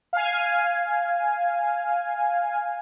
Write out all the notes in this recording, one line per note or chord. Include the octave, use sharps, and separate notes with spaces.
F5 G#5